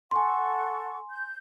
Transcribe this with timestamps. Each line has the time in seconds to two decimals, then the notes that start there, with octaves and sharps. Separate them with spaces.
0.11 A4 F#5 G#5 C6 C#6
1.10 G6